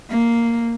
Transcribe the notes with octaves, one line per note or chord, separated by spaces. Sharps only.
A#3